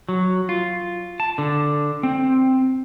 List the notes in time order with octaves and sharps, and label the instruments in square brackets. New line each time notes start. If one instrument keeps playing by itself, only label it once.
[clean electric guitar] F#3
F4
A5
D3
C4